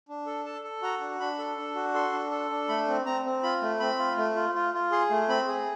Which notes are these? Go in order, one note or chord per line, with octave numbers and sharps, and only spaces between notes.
D4
A4
A4 A5
A4
F#4 A#5
D4
D4 B5
A4
D4
F#4
A4 C6
D4
A4
D4
A3 B5
C4
C4 A#5
C4
F4 B5
A3
C4 B5
F4
A3
F4
F4
F4
G#4 C6
A3
C4 B5
G#4